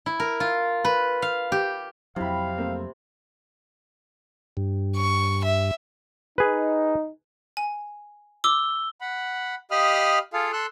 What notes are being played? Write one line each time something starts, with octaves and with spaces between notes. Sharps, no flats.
E4
A#4
F4
B4
F5
G4
F2 C3 F#3 E4 E5 F5 B5
A3 A#3 C4
G2
C#6
E5
D#4 G#4 B4
G#5
D6 E6 G7
F#5 B5
G4 D#5 F5 B5 D#6 F6
F4 G#4 A4 F5
A4 C6 E6 F#6